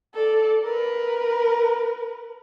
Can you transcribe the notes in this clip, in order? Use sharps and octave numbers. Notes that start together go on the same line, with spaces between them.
A4 D5
A#4 B4